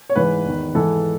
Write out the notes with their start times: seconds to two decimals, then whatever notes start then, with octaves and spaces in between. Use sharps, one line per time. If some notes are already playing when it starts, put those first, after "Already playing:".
0.10 C#5
0.16 G#2 E3 B4
0.45 E2 D#3
0.75 G#2 E3 A4